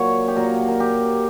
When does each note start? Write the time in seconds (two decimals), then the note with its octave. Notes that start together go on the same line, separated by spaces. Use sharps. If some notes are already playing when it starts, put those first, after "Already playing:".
Already playing: A#2 F#3 C#5
0.28 G4
0.36 A#2 F#3 A#4
0.68 A#4
0.80 G4